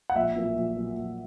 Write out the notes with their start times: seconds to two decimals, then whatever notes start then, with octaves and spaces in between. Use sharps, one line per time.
0.10 F#5
0.15 A#1 E5
0.36 A#2 F#3 A#3
0.56 A#1
0.76 A#2 F#3 A#3
0.96 A#1